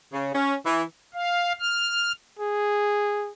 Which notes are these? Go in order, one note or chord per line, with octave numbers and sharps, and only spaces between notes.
C#3
C#4
E3
F5
F6
G#4